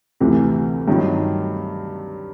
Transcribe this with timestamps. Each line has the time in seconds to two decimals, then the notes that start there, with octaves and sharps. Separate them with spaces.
0.20 D2 C3 E3
0.88 G2 D#3 F#3